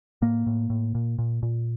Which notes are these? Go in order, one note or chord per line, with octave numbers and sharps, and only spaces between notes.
A2 A#3
A2
A2
A#2
A#2
A#2